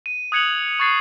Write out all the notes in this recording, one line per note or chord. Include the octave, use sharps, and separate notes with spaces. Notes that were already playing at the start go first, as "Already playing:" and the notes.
D#7
D#6 F#6 G#6 C#7 F7 F#7
C#6 F#6 G#6 A6 C7 D#7